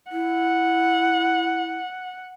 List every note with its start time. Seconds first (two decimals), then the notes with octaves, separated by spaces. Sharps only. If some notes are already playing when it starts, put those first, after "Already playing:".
0.12 E4 F#5